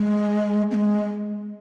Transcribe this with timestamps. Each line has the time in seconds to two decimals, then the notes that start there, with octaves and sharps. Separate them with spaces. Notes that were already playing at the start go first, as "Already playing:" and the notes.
Already playing: G#3
0.71 C4
0.74 G#3